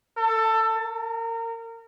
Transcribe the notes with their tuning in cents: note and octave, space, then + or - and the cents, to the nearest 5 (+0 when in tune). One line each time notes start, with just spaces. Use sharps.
A4 +20
A#4 -30